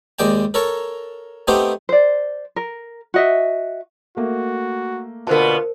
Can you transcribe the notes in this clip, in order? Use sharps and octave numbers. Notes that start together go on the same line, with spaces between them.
D#2 G#3 D5 G5 A5
A4 A#4 C#5 A5 A#5
A3 B3 C4 D#4 G4 C5
C5 D5
A#4
F#4 D#5 E5
A3 A#3 F#4
B2 D3 B3 F4 A#4 C5 A5